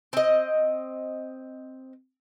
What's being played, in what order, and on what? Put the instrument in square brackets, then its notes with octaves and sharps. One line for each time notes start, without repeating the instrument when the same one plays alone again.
[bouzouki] C4 D#5